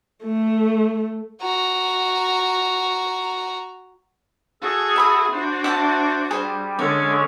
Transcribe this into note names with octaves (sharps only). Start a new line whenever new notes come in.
A3
F#4 A#5
F#4 G#4 A4
E5 B5 D#6
D4 F#4 C5
E5 F#5 A5
G3 G#4 C5
D3 G#3 C#4 C#5 D5